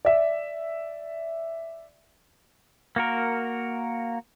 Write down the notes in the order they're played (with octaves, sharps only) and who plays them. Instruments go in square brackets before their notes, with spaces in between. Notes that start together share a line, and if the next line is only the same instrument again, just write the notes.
[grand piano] D5 E5
[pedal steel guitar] A#3 F#4 A#4